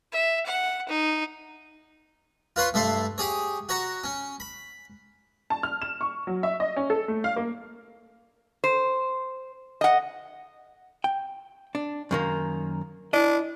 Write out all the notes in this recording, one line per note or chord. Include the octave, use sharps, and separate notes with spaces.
E5
F#5
D#4
F4 B4 C#5 C6
G2 A3 E5 C6
G4 G#4 C#5
F#4 C#5 A#5
C#4
B5
A5
F6
E7
C#6
F#3
E5
D#5
C#4
A4
A3
F5
A#3
C5
D#5 F#5
G5
D4
F#2 D#3 A#3
D4 E4 D#5